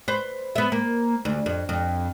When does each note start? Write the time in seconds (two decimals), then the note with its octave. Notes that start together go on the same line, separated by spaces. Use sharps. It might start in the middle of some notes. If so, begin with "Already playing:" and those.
0.08 B4 C5
0.55 B3 E5
0.72 A#3
1.25 D2
1.46 F2
1.69 F2